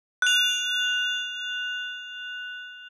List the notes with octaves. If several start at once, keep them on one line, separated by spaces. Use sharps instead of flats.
F#6 F7